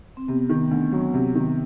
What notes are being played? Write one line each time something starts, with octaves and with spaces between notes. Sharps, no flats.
C4
C3 B3
D#3
D2
F#3
C3
D#3